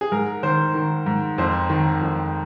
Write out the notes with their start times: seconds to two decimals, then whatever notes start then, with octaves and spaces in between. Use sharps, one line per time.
0.01 G#4
0.12 G#2 A#4
0.43 D#3 C5
0.75 D#3
1.06 G#2
1.38 F2 C5
1.70 D#3
2.01 F2